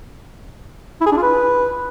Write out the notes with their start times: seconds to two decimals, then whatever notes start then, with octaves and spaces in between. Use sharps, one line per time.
1.01 E4
1.06 G#4
1.12 D4
1.17 F4
1.23 B4